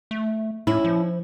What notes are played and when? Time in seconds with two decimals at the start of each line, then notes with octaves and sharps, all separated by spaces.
0.11 A3
0.67 A2 C#4 E4
0.85 F3